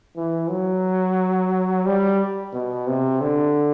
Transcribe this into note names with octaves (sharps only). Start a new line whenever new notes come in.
E3
F#3
G3
B2
C3
D3